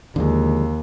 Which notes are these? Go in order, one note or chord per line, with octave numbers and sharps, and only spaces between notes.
D#2 D3 F3 G#3